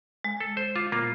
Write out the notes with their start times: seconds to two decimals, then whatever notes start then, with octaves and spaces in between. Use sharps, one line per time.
0.24 G#3
0.41 A4
0.57 C5
0.76 F4 D6
0.92 A#2 A#3 B3 F4